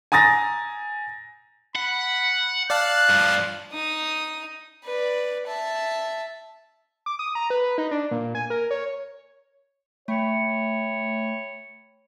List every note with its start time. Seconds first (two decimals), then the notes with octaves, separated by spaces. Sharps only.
0.12 G#5 A#5 D#6 A6 A#6
1.76 F#5 B5
2.70 D5 F5 A5 F#6
3.09 G2 F3
3.72 D#4 D#6
4.84 B4 D5
5.47 E5 A5
7.06 D6
7.19 D#6
7.35 A#5
7.50 B4
7.78 D#4
7.91 D4
8.11 A#2
8.35 G#5
8.50 A#4
8.71 C#5
10.08 A3 C#5 E5 G5 B5